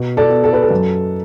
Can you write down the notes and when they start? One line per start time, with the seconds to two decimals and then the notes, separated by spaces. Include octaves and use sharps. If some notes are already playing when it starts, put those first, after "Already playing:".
Already playing: B2
0.17 A4 D5
0.30 B3
0.44 A4
0.53 B4
0.63 A4
0.71 F#2